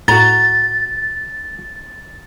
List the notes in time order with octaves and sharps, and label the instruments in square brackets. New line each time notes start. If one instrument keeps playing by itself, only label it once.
[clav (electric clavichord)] A2 [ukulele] F#4 A#5 [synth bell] A6